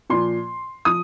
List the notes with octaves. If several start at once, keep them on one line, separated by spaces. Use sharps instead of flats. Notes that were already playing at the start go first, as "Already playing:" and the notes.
A#2 F3 C6
F3 D#6